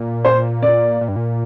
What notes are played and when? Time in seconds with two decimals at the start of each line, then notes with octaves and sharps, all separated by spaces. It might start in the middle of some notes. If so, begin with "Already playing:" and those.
Already playing: A#2
0.25 C5
0.63 D5
1.01 A#2
1.08 G2
1.16 A#2